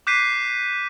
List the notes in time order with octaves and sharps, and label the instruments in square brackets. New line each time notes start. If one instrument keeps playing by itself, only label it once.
[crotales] D6 F#6 G6 B6 C7 D#7